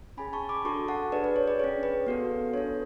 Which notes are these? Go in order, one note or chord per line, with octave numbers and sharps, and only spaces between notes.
C#4 G#4 G#5 B5
A5 C#6
B5 D6
D4 F#4 A4 A5 C#6
F#5 A5
D4 G#4 B4 D5
B4
C#5
B4 D5
C#4 G#4 C#5
B4
B3 F#4 A4
D4 A4 C#5